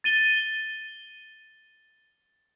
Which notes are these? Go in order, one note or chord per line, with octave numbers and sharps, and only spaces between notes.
A6 D#7 G7